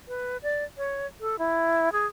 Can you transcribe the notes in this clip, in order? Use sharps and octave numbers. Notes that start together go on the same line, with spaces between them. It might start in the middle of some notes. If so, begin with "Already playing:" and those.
B4
D5
C#5
A4
E4
G#4